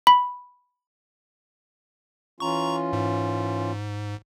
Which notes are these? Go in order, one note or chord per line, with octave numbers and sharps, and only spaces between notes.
B5
E3 C#4 F4 A#5 C#6
G#2